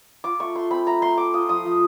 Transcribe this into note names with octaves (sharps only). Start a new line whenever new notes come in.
F4 D6
A3 C#6
A3 C6
C4 B5
A3 A#5
A3 C6
A3 D6
F4 D#6
F3 D#6
F3